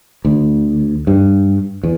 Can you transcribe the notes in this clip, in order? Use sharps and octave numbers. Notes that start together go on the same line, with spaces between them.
D2
G2
E2